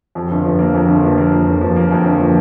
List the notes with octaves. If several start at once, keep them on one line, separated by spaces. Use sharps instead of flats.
F2
G1
F3
A#3
F2
G1
F3
A#3
F2
G1
F3
A#3
F2
G1
F3